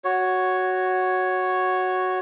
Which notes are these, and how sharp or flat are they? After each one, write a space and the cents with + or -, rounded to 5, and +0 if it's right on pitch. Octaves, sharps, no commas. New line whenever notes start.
F#4 +0 C#5 +0